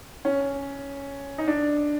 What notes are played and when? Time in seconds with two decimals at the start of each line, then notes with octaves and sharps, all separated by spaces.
0.25 C#4
1.38 D#4
1.48 D4